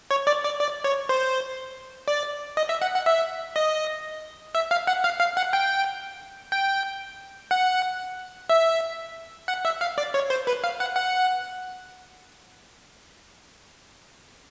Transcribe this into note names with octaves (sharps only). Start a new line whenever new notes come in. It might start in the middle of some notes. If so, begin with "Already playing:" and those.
C#5
D5
D5
D5
C#5
C5
D5
D#5
E5
F#5
F#5
E5
D#5
E5
F5
F#5
F5
F5
F#5
G5
G5
F#5
E5
F#5
E5
F5
D5
C#5
C5
B4
F5
F#5
F#5